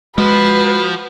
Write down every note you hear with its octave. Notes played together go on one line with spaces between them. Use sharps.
F3 G#3 F#4 B4